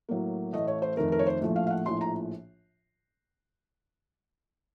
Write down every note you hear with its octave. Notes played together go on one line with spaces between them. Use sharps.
A2 F#3 A#3
A1 A2 A3 D#5
C#5
C5
F2 D#3 A3 A#4
A#4
C#5
C5
A#1 A2 F3 A3
F5
F5
F#5
A#1 A2 F3 C6
A#5